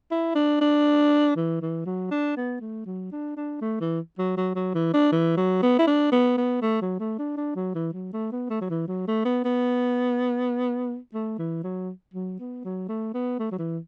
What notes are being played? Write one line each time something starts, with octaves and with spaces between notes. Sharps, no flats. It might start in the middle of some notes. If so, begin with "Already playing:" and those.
E4
D4
D4
E3
E3
F#3
D4
B3
A3
F#3
D4
D4
A3
E3
F#3
F#3
F#3
E3
D4
E3
F#3
B3
E4
D4
B3
B3
A3
F#3
A3
D4
D4
F#3
E3
F#3
A3
B3
A3
F#3
E3
F#3
A3
B3
B3
A3
E3
F#3
F#3
B3
F#3
A3
B3
A3
F#3
E3